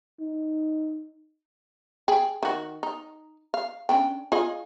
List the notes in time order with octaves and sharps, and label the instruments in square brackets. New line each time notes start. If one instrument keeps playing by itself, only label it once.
[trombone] D#4
[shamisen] G#4 G5
D#3 F#4
D#4
F5
C#4 D4 G5
F4 G#4 D#5